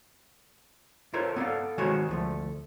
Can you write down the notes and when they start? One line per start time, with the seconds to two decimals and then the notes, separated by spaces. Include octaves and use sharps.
1.13 F4 A4 A#4 C5 C#5
1.36 B3 A4 D5 F5
1.78 D#3 G#3 F#4 G#4 C5 C#5
2.09 D2 F3 A3